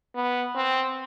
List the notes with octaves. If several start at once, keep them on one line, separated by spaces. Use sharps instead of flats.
B3
C4